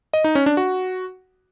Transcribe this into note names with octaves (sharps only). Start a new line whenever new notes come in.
D#5
D#4
C#4
D4
F#4